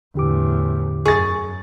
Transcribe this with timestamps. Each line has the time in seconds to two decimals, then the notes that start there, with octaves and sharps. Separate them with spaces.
0.15 E2 A2 D3 G4 D6
1.06 F#2 G#4 C#6 A6